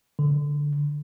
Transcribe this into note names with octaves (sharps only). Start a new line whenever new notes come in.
D3